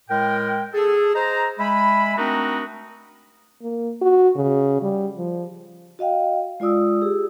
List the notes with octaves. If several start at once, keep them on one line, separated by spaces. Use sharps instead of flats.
A2 G#3 A#4 G5
G#4 A4
G#4 C5 D#5 A#5
G#3 E5 G#5 B5
A3 C4 D4 D#4 F#4 A#4
A#3
F#4
C#3
G3
F3
F#4 D#5 F5 G5
G#3 F4 D5 D#6 E6
G4 G#4 E6